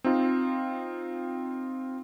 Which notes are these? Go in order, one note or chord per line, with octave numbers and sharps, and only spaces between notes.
C4 D#4 F4